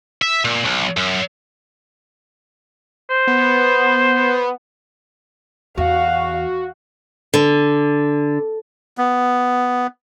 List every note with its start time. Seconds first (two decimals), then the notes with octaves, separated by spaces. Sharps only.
0.22 E5
0.45 A#2
0.65 B1
0.97 F#2
3.10 C5
3.27 B3
5.78 E2 F#4 F5
7.34 D3
8.98 B3